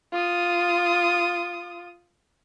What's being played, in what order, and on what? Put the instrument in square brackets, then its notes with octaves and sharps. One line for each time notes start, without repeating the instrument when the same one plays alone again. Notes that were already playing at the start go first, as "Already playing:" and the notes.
[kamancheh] F4 D#6